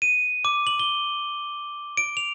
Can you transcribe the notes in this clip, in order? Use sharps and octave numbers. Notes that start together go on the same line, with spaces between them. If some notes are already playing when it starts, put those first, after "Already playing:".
D#7
D6
F#7
G7
D7
F7